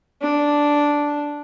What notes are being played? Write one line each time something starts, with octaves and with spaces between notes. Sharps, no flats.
D4